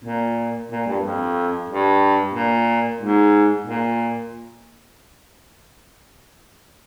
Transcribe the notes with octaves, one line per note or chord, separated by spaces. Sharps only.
A#2
A#2
G2
F2
G2
A#2
G#2
A#2